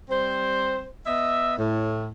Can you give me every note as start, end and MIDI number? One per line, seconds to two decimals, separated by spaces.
0.09 0.85 55
0.09 0.85 60
0.09 0.85 72
1.05 1.54 59
1.05 1.54 75
1.05 1.54 76
1.58 2.09 45